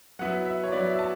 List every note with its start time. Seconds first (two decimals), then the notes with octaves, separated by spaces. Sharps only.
0.19 F#3 B3 E4 F#5
0.45 E5
0.64 C#5
0.72 F#3 B3 E4 D5
0.90 E5
0.99 A5